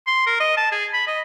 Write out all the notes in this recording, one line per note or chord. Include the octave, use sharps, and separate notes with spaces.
C6
A#4
D#5
A5
G#4
B5
D#5